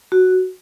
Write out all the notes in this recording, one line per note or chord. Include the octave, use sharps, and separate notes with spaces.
F#4